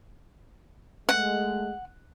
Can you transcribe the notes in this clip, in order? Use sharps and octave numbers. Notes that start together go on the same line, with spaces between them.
G#3 A3 F#5